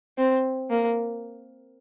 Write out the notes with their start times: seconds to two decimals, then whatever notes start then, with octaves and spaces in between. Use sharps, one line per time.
0.18 C4
0.70 A#3